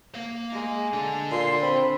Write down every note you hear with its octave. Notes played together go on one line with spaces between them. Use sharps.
A#3 F5
G#3
D4 A4
A#2 C6
C4 B5